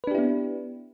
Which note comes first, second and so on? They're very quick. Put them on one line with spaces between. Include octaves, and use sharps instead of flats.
B4 D4 G4 E4 B3